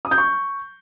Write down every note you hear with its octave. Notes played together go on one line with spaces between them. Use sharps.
D#6
G6
C#6